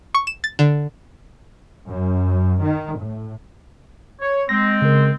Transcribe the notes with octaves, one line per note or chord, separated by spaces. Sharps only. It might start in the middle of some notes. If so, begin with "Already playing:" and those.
C#6
E7
A6
D3
F#2
D#3
A2
C#5
G#3 C4 A#6
C#3 A#4